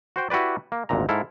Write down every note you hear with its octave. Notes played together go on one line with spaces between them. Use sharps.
F#4 C5 G5
E4 F#4 G4 B4 D5
A#3
G#1 D2 A#2 A#5
G#2 E4 A4 F5